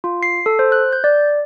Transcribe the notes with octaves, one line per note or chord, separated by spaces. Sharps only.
F4
C7
A4
C5
F#6
G6
D5